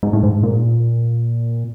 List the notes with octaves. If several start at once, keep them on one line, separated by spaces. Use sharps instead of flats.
G#2
A2
G#2
A#2